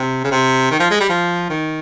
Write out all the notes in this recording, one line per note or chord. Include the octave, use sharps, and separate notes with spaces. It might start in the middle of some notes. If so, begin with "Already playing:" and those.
Already playing: C3
C#3
C3
D#3
F3
G#3
G3
F3
D#3